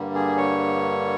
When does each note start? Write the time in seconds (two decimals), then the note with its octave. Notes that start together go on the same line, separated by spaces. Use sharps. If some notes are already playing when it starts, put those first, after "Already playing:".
Already playing: G2 D3 G3 A#3
0.14 G#4
0.37 C#5